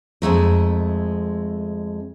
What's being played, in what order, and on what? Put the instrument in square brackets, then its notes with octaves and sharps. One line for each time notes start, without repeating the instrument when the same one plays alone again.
[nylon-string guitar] F2 G#3 A3 A#4